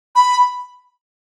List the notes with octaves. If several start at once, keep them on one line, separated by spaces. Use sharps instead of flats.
B5